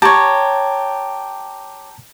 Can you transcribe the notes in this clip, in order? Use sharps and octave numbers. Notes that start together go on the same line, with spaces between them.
G4 C#5 A5 A#5